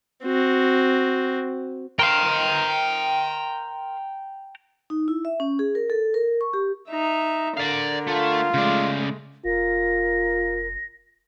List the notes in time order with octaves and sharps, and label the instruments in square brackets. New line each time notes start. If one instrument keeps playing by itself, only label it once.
[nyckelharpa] C4 F#4
[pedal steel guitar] A#4 C5 F5 [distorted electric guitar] G5 A#5
[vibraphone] D#4
E4
E5
C#4
G#4
A#4
A4
A#4
C#6
G4
[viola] D#4 E5
[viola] D3 A#4 [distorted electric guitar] D5 F5
[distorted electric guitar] A3 [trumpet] F4
[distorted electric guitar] C#3 D5 [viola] G#3 A3
[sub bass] F1 [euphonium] F4 [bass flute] A#4 [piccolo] A#6